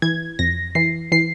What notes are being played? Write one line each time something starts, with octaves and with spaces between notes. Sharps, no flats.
E3 G#6
F2 A#6
E3 C7
E3 C7